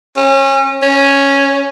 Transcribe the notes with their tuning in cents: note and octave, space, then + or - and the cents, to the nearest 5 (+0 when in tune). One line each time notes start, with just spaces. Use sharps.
C#4 -30
C#4 +0